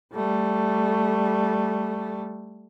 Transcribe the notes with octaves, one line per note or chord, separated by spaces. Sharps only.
G3 A3